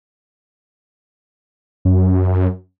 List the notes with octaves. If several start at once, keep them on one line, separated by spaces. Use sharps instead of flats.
F#2